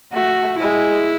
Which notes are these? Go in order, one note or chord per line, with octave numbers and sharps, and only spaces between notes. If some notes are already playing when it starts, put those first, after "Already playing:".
A3 F#4
G#3 E4